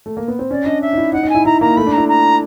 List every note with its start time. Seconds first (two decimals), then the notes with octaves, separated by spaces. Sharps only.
0.06 A3
0.17 A#3
0.28 B3
0.39 C4
0.50 C#4 D5
0.65 D4 D#5
0.81 E5
0.93 D#4
0.97 E4
1.13 D#4 F#5
1.23 D#4
1.29 G#5
1.35 E4
1.45 E4 A#5
1.61 A#3 A#5
1.76 A3 B5
1.87 D4
1.93 A#5
1.98 E4
2.08 A#5